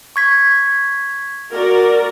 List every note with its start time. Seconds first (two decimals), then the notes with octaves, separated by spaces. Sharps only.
0.16 C#6 G#6 B6
1.52 F#4 A#4 D5